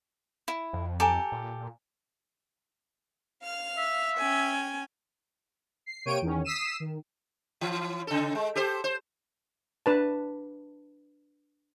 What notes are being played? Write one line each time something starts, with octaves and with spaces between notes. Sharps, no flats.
E4
F2
G4 A4 G#5 A#5 D6
A#2
F5 F6
E5
C#4 G5 G#5
C7
C3 A#3 C#5 G5 D7 D#7
E2 D#3 C#4
D#6 E6 B6 C7 D#7 E7
D#3
E3
C#3 A4
G#3
G4 A4 C5
C5
D4 B4 A5